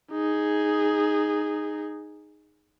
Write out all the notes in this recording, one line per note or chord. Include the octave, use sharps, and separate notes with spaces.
D#4 G#4